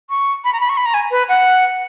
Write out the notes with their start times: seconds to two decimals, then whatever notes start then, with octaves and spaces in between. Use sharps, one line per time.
0.10 C#6
0.44 B5
0.53 A#5
0.60 B5
0.69 C#6
0.77 B5
0.86 A#5
0.94 G#5
1.11 B4
1.29 F#5